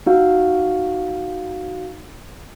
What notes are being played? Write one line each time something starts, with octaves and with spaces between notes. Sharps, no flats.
D#4 F#4 F5